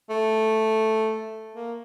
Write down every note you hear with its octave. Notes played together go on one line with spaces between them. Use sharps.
A3
A#3